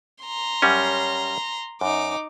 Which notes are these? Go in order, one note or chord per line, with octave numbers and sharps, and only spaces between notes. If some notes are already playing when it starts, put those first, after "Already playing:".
A#5 C6
F#2 G3 C#4
F#2 D#4 D6